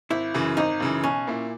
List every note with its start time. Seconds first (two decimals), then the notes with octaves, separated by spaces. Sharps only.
0.10 G#1 E4
0.34 F#2 C#3 E3
0.57 G#1 D#4
0.80 F#2 C#3 E3
1.04 B1 C#4
1.27 A#2 A#3 E4